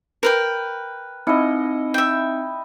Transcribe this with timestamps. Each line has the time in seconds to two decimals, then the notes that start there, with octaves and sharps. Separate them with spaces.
0.23 A#4 B4 G5
1.27 C4 D#4 E4 D#5 C#7
1.94 E5 G5